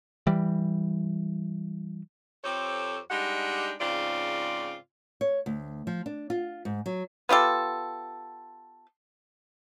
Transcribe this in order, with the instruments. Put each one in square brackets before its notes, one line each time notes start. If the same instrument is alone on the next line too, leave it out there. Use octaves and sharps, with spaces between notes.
[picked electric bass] E3 G3
[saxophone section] F2 C4 G4 A4 C5 C#5
G3 G#3 D4 D#4 G4 F#5
G#2 C#3 C4 F4 D5
[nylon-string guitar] C#5
D2
F3
D4
F4
G#2
F#3
[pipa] B3 F4 G4 A4